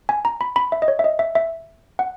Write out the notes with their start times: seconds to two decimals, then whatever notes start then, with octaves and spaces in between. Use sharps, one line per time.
0.09 G#5
0.25 A#5
0.41 B5
0.56 B5
0.72 E5
0.82 D#5
0.88 C#5
0.99 E5
1.04 D#5
1.19 E5
1.35 E5
1.99 F#5